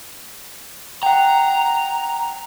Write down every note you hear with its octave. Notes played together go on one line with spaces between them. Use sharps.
F#5 G5 A#5